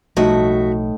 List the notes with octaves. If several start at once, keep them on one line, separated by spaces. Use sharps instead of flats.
B1 A2 F3 G3 D#4 F#4 E5